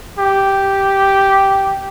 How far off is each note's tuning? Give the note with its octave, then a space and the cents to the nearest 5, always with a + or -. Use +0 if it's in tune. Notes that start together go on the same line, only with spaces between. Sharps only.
G4 -5